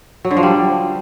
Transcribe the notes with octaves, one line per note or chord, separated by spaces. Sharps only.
F#3
D3
F3
G3